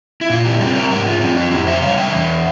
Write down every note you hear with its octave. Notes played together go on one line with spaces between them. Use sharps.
E4
A#2 F4
E4 G4
G3 C4 F4 G#4
G4 A#4
G#2 G4 A#4
F4 G#4
F3 C4 F4 G#4
F4
F2 E4 G4
C5 E5
C#3 G3 C#5 F5
E5 G5
E2